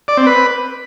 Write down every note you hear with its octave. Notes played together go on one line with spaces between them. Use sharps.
D5
C4
B4